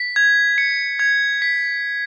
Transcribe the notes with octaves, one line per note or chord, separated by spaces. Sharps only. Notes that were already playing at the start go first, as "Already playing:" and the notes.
Already playing: B6
G#6
C#7
G#6
B6